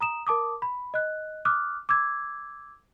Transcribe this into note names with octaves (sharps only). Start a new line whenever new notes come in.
A#5 D#6 E7
A#4 A5 D6 D#6
B5
D#5 F#6
D6 D#6 F6 F#6
D6 E6 G#6